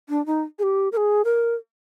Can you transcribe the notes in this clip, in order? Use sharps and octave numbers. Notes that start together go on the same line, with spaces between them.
D4
D#4
G#4
G4
A#4
G#4
A#4